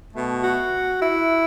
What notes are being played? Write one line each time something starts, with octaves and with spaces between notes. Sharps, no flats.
B2 A3
F#4
E4